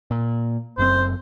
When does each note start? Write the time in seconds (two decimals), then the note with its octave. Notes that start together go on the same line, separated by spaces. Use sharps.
0.11 A#2
0.78 F#1 F#2 C4 C5